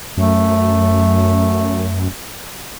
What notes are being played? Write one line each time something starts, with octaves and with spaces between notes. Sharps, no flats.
F#2 A3